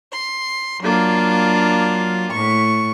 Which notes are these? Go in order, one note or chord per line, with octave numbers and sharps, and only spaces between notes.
C6
F#3 A#3 D4 F4
A2 C#6